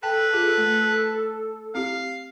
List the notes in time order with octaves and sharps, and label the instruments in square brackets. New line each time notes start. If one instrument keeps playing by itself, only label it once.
[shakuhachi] A4 [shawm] B4 [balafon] G5 A5
[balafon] F4 G#4
A3
[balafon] C4 E4 G4 [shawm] F5